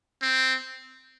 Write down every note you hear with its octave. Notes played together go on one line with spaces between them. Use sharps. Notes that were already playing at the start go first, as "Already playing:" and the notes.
C4